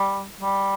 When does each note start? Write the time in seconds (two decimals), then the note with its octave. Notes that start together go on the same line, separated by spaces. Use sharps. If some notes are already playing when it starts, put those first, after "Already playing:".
Already playing: G3
0.40 G3